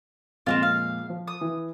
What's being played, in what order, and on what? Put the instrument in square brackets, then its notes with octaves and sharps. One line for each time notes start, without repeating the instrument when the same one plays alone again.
[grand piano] F2 A#2 G#3 [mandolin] C4 C#4 F4
[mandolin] F5
[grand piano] F3
[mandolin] D#6
[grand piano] E3